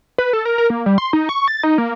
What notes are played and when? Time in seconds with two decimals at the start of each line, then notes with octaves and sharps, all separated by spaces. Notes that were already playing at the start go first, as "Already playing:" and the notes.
0.18 B4
0.33 A4
0.45 A#4
0.58 A#4
0.70 A#3
0.86 G3
0.98 C6
1.13 D#4
1.29 C#6
1.48 A6
1.63 D#4
1.78 A#3